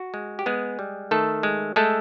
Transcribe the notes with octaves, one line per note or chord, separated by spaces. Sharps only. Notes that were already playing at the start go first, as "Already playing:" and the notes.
Already playing: F#4
G#3
G4
G#3 B3 G#4
G3
D#3 A3 A4
G#3
G#3 A3 A4